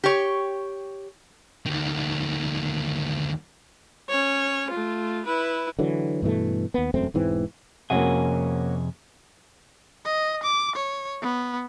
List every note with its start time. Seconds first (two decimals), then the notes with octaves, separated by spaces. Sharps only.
0.04 G4 C#5
1.66 D2 D#3
4.10 C#4 C#5
4.70 A3 F4
5.25 E4 B4
5.79 D3 E3 F#3
6.22 G2 B2 E3 A3
6.74 D#2 B3
6.94 E1 F#2 A3 C4
7.14 E1 G#2 E3 C4
7.90 F2 C3 A#3 C#4 F#4 G#4
10.05 D#5
10.43 D6
10.76 C#5
11.22 B3